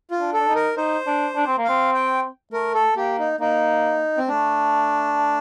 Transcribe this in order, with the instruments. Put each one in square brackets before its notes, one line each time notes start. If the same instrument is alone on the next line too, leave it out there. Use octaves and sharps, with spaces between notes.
[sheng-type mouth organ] F4
[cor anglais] D4
[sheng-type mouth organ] A4
[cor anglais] D4
D#4
[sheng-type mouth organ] A#4
[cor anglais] D#4 [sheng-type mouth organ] C5
[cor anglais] D4
D4
C4
A#3
[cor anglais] C4 [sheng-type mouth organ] F5
[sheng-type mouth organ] G5
[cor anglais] A3 [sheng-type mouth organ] A#4
[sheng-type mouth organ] A4
[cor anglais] A#3 [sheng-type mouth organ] G4
[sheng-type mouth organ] D#4
[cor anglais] A#3 [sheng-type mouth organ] D#4
[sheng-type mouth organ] C4
[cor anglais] A3 [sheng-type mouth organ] D4